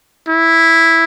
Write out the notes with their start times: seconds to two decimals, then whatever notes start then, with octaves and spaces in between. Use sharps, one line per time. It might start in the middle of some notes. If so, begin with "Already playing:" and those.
0.28 E4